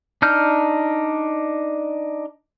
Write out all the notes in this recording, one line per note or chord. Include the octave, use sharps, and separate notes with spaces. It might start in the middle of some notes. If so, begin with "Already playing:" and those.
D4 D#4 F6 G6